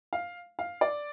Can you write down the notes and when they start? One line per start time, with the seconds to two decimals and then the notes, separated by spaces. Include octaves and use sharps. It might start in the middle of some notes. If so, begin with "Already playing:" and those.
0.13 F5
0.59 F5
0.81 D5